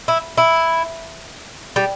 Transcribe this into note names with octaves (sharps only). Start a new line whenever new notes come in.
E4
E4
G3